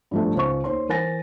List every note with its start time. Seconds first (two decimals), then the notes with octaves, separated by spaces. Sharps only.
0.11 G2 F3 A3
0.35 C#2 C5 C#6
0.64 D#2 C5 C#5 C6
0.89 E3 A#4 C5 G#5 A6 A#6